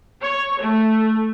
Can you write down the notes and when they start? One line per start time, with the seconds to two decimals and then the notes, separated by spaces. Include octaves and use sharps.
0.21 C#5
0.60 A3